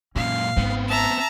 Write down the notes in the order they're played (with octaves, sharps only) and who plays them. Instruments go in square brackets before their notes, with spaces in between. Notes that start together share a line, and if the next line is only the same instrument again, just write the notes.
[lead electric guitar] F#2 A#2 [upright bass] C#4 [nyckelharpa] F5
[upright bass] G#1 [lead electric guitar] B3 C4
[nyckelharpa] E5 [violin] A5 A#5